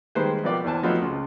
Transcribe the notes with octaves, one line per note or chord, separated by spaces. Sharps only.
D#3 G3 G#3 A#3 B4 C5
B2 F3 A#4 B4 D5 G5
E2 E3 C5 G#5 A5
F3 F#3 A3 B3 C4 D#4
C#2